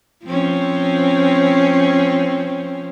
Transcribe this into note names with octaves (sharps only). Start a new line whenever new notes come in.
F3 C4 C#4